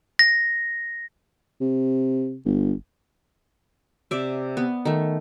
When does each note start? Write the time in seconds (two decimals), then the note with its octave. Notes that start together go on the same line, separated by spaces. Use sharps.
0.19 A#6
1.61 C3
2.45 G1
4.11 C3 D5 E5
4.57 B3
4.85 D#3 A3